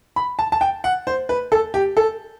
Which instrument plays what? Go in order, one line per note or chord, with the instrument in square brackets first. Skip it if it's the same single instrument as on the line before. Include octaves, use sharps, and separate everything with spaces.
[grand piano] B5
A5
A5
G5
F#5
C5
B4
A4
G4
A4